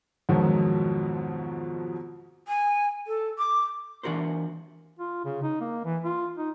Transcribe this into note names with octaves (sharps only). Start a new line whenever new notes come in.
F2 G#2 B2 D#3 F3 F#3
G#5
A4
D6
E3 D4 F#4 A#4 C5
F4
C#3
D#4
A#3
E3
F4
D#4